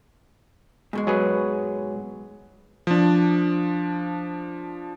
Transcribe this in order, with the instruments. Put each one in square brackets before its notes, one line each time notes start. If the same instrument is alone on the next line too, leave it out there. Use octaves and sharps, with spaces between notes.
[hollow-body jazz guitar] G#2 B2 G#3
[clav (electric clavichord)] F#3 G#4 B4
[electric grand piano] F3 D4